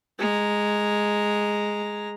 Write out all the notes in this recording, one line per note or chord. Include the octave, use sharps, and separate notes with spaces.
G#3 A#5